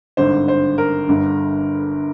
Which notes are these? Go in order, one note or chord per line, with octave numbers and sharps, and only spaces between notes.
G#1 G2 D3 C5
C5
A#4
G1 G2 D3